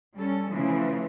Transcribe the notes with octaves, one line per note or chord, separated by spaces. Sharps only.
G3 C#4 A4
C#3 E3 F3 A3